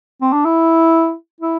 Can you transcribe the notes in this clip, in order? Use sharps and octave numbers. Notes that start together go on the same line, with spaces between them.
C4
D4
E4
E4